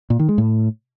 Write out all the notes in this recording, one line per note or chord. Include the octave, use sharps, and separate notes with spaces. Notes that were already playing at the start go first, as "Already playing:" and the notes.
A#2
D#3
G#3
A2